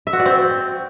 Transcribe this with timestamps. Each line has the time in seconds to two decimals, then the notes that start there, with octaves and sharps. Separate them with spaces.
0.07 E5
0.13 F#4
0.19 D5
0.26 C4